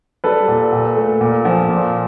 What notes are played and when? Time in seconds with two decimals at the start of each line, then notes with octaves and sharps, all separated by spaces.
0.24 G3 A4 B4
0.48 A#2
0.72 A#2
0.96 A3
1.21 A#2
1.45 F3
1.69 A#2